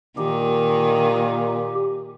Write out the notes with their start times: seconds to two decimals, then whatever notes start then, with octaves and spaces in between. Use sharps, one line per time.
0.18 A#2 D#3 G4